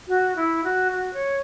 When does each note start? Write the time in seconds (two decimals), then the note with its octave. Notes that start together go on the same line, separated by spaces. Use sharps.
0.08 F#4
0.36 E4
0.64 F#4
0.92 F#4
1.14 C#5